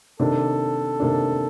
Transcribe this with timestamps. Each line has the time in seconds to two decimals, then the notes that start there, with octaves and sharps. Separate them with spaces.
0.20 C3 D#3 A#3 D4 A4
1.00 C3 D#3 A#3 D4